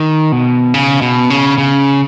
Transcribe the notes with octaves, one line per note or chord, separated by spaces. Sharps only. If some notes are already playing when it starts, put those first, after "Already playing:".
Already playing: D#3
B2
C#3
B2
C#3
C#3